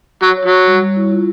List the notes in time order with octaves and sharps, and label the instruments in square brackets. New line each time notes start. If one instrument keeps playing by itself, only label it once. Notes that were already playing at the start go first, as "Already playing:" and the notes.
[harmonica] F#3 [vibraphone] C#5
[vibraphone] C#5
[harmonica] F#3
[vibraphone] C#5
G3
G3
E4
F4